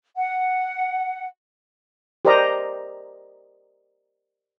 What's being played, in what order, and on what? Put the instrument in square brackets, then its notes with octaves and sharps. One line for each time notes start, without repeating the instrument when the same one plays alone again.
[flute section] F#5
[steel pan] G4 A#4 C5 D5 D#5 A#5